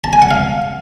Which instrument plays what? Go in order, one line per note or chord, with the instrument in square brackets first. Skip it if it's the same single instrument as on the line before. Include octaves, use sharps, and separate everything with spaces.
[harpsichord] A5
G#5
F#5
F5